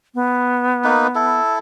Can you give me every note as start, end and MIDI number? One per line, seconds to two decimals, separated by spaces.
0.15 1.40 59
0.84 1.07 58
0.84 1.07 63
0.84 1.07 71
1.15 1.59 64
1.15 1.59 69